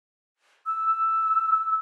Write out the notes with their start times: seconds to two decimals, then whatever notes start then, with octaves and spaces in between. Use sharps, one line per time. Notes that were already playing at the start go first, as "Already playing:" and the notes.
0.67 E6